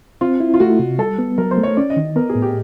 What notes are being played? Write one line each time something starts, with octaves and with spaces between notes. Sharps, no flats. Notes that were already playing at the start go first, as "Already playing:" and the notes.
C4 F4
E4
F4
A3 F#4
C3
G3 A4
B3
F#3 A#4
C5
A3
C#5
C#4 D5
D#5
D#3
B3 A#4
G#4
A2
G4